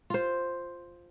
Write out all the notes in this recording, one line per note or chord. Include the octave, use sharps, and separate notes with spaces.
F4 C5